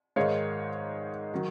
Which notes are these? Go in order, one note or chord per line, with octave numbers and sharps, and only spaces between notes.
G#2 D#3 G#3 C#5 F5
D#3 F#3